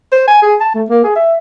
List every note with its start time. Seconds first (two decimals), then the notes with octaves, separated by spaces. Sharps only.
0.12 C5
0.27 G#5
0.42 G#4
0.60 A5
0.75 A3
0.89 A#3
1.04 G#4
1.16 E5